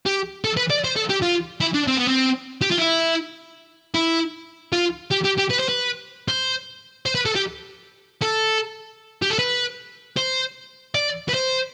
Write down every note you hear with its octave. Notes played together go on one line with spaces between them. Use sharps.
G4
A4
B4
D5
C5
A4
G4
F4
E4
D4
C4
B3
C4
G4
F4
E4
E4
F4
G4
G4
G4
B4
C5
B4
C5
C5
B4
A4
G4
A4
G4
A4
B4
C5
D5
B4
C5